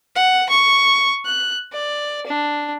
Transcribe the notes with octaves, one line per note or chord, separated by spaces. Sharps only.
F#5
C#6
F#6
D5
D4